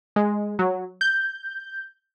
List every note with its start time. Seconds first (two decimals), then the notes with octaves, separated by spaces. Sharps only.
0.16 G#3
0.59 F#3
1.01 G6